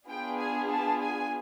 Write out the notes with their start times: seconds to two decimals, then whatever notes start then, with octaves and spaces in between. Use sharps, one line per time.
0.09 B3 D4 F4 G#4 G5
0.40 G#5
0.70 A5
1.02 G#5